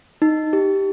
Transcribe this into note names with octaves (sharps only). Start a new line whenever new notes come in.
D#4
G4